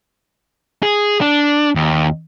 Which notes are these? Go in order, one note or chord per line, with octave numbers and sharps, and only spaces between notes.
G#4
D4
D#2